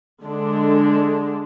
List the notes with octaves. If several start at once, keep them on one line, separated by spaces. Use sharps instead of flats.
D3 G#3 D4